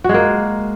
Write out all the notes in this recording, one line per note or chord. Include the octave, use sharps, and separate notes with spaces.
G#3 A#3 F#4